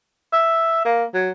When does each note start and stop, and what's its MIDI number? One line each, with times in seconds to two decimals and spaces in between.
0.33 0.81 76
0.85 1.04 58
1.14 1.31 54